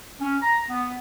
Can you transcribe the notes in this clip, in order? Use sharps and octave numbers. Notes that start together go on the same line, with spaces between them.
C#4
A#5
B3